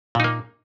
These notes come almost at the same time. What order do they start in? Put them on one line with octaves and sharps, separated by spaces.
A#2 D#4 A#3